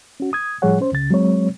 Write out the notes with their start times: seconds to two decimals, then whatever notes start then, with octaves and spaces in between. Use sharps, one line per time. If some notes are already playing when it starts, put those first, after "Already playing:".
0.20 C#4 F#4
0.33 D#6 G#6
0.62 A2 F3 G3 G#4 C#5 F#5
0.81 C#4 C5
0.92 C#2 C#3 A6
1.11 F#3 G#3 C4 C#5